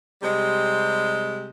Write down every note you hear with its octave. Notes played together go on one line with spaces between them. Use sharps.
C3 G3 G#3